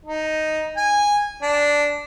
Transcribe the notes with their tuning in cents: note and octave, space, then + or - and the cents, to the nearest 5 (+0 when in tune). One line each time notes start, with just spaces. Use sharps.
D#4 +0
G#5 -15
D4 -5